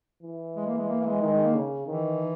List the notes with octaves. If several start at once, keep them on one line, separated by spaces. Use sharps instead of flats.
E3
G#3
A#3
G#3
A#3
A#3
G#3
D#3 G#3
G#3
A#3
C#3
D#3 E3